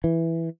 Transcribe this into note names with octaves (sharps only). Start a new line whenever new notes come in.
E3